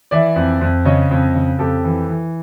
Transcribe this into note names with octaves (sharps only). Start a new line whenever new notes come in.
E3 D5 E5
F2
F2
C#3 C#5 D#5
F2
C#3
F2 G4 A4
E3
E3